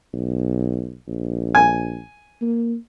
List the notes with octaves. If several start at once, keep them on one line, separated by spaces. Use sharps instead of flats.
B1
A#1
G#5
A#3